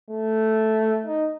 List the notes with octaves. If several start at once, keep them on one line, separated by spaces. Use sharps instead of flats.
A3
D#4